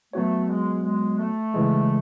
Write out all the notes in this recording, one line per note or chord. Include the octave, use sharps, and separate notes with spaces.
F#3 A3 B3 F#4 C#5
G#3
G#3
A3
C#3 E3 G#3